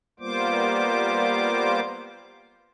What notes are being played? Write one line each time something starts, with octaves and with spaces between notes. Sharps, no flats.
G3 A#3 B3 F4 C5 D6